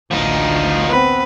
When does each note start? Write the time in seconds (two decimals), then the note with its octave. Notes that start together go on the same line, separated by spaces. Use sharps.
0.11 A1 D2 F3 D#4
0.90 B3 C4 B4